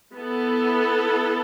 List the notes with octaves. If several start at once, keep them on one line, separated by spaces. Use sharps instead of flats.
B3 E4 A4